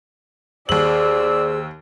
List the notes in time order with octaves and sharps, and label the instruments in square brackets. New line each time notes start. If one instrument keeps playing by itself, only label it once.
[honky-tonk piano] D#2 F#7 [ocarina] G#4 [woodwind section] C5 E6 [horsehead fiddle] D5